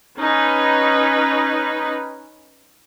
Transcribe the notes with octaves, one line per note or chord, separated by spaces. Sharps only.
C#4 D#4 B4